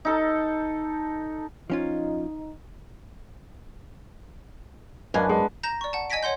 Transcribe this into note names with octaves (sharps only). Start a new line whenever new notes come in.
D#4 A4
F3 C#4 D#4 F4
F#2 D4 B4 D#5 F5 G#5
G#3 B3
A#5 G6 A#6 E7
D5 C#6
F#5 A5
D#5 G#5 G#6 A#6 B6 D7
C#5 F#5 C6 G6